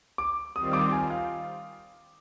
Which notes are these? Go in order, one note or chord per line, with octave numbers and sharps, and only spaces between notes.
D6
D#3 G3 C4 F4 D#6
D6
G#5
F5